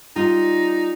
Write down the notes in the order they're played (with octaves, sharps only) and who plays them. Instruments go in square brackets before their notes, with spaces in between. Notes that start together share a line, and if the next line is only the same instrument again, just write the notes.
[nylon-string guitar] G3 F4 [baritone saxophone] D#4